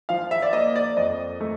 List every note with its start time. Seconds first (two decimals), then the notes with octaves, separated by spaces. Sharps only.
0.09 F3 F5
0.31 E5
0.42 D5
0.53 A#3 D#5
0.76 D5
0.97 F2 D#5
1.40 A3